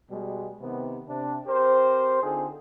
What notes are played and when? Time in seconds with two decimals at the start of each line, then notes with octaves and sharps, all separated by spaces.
0.10 B2 G3 G#3
0.62 C3 D#3 B3
1.08 C3 D4
1.47 C4 G4 A#4 C5
2.23 D3 C4 D#4 F4 G#4 A4